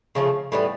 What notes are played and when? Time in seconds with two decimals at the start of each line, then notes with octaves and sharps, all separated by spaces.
0.15 C#3 F3 A3
0.52 A2 E3 G3 B3